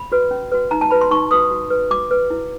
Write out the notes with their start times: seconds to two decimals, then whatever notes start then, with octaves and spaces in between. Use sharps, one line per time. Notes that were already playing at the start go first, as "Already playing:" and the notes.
Already playing: B5
0.12 F#4 B4
0.31 C#4
0.52 F#4 B4
0.71 D#4 A#5
0.81 A5
0.91 F#4 B4 B5
1.01 C6
1.11 D#4 C#6
1.31 F#4 B4 D#6
1.51 F#4
1.70 B4
1.91 F#4 D6
2.11 B4
2.30 E4